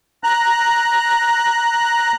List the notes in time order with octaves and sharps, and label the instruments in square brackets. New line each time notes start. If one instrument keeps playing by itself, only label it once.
[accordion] A#5 F#6